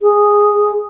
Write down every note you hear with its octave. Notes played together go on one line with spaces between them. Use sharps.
G#4